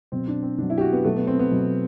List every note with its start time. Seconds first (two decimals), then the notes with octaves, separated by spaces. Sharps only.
0.12 B2 F#3 C4
0.27 D4
0.43 C4
0.58 B2 F#3 D4
0.70 E4
0.78 G4
0.81 F#4
0.93 B3
1.05 B2 F#3 A3
1.16 B3
1.27 C4
1.39 B3
1.51 B2 F#3